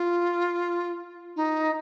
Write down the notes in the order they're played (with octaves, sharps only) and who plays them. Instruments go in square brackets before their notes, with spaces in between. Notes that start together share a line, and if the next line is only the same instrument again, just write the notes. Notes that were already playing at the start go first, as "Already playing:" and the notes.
Already playing: [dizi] F4
D#4